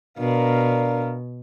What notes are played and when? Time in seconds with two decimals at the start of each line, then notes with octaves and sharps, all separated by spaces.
0.18 B2 D4 A#4 F5